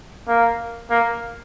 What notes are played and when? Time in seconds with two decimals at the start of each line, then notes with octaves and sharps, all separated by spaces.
0.28 A#3
0.90 A#3